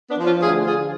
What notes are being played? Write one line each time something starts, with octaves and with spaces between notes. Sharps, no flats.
B3 D4
F3
C#4 F4
D2 F4 G#4
D3 F3 F4 G#4